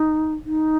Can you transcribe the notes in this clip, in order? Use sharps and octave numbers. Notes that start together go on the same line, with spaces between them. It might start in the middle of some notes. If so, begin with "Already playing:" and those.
Already playing: D#4
D#4